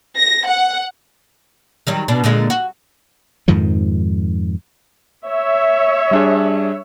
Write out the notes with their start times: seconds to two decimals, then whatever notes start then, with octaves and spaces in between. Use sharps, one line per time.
0.18 A#6
0.49 F#5
1.87 D#3 F#3 G3
2.08 B2 D4
2.24 A#2 D3 G#3
2.50 F#4
3.48 F2 G#2 D#3 F3
5.25 C#5 E5
6.11 G3 D4 G#4